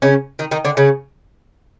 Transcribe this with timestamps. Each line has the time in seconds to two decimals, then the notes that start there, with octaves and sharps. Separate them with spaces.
0.02 C#3 C#4
0.39 D#3 D#4
0.51 D#3 D#4
0.65 D3 D4
0.77 C#3 C#4